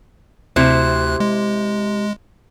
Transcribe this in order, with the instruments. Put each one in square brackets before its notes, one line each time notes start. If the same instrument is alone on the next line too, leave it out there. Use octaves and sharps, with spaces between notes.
[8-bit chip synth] D2 F#6 [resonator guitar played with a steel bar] C3 E4 C5
[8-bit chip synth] G#3